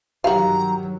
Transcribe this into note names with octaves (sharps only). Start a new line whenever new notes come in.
G2 D#3 F#3 F#4 G4 F5 A#5